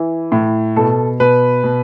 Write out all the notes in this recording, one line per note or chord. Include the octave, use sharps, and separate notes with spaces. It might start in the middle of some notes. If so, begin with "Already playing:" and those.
Already playing: E3
A2
B2 A4
B2 B4
B2